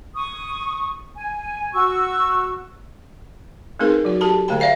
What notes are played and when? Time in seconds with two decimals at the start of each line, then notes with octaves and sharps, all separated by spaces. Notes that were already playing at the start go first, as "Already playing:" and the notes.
0.14 C#6 D#6
1.16 G#5
1.73 F#4 C#6 E6
3.79 A3 C4 D#4 G#4 A#4 B4
4.05 F#3 F#4
4.21 G4 A4 A5 B5
4.48 D3 A3 G#4 C5 G5 B5
4.60 D5 E5 F5 G#5